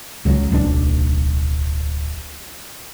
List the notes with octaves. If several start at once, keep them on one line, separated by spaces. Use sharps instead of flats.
C#2 C#3 F#3
D1 B1 D4